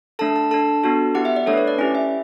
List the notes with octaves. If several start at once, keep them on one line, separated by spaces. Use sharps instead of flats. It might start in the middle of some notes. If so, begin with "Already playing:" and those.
A3 D4 A4 A5
A5
D4 A4 A5
B3 D4 F#4 A4
B3 E4 G4 F#5
E5
D5
A3 D4 A4 C#5
B4
C#5
D5
C#4 E4 G4 D5
E5